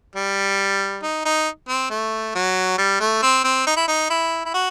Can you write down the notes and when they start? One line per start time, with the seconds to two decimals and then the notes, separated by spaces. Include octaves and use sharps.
0.15 G3
1.03 D#4
1.25 D#4
1.69 C4
1.90 A3
2.35 F#3
2.78 G3
3.00 A3
3.23 C4
3.44 C4
3.67 D#4
3.77 E4
3.88 D#4
4.10 E4
4.45 E4
4.54 F#4